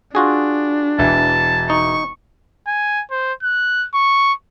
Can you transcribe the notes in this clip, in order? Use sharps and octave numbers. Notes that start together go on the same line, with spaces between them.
D4 F4 F#4 G#4
E1 E3 A5
D#4 C#6
G#5
C5
F#6
C#6